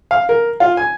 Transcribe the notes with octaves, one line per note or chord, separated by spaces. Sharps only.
F5
A#4
F4
G#5